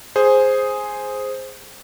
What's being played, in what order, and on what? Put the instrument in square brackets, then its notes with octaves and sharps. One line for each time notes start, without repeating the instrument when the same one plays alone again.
[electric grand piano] G#4 C5